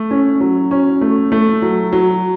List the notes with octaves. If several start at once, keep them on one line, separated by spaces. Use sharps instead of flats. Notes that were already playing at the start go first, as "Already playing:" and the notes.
Already playing: A3
C#4
F#3
C#4
A3
A3
F#3
F#3